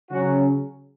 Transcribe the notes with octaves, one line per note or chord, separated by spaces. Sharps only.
C#3 F#3 C#4 F#4